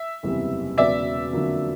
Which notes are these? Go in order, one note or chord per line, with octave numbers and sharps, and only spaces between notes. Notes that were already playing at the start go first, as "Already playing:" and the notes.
Already playing: E5
F#1 E2 C3 E3 G3
E1 E2 C#3 F#3 B3 D5 E5
F2 D3 F#3 A#3